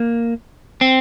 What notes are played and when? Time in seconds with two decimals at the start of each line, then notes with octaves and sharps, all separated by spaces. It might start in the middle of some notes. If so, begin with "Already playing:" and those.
Already playing: A#3
0.81 C4